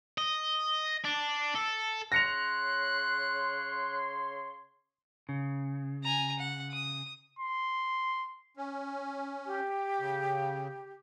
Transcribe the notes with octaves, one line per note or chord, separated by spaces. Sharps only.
D#5
D4
A4
C#3 C#5 C6 F#6 A#6 C#7 F7
C#3
G#5 A#5
F#5
D#6
C6
C#4
G4
C#3